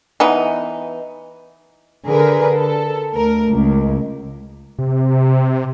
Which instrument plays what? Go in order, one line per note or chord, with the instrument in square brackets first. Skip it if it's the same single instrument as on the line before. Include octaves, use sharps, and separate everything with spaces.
[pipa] E3 B3 D#4
[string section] D3 G#4 A#4 B4
A4
D2 A#4
C#2
[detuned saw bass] C3